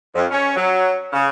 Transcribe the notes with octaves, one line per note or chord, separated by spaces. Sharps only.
F2
C#4
F#3
C#3